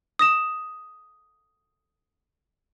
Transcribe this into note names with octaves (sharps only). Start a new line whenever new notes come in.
D#6 A#6 E7